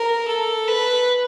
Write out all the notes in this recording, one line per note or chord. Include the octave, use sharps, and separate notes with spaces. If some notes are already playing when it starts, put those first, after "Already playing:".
Already playing: A#4
A4
B4